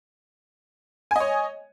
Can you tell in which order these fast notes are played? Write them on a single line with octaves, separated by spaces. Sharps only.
G#5 D#5 C#5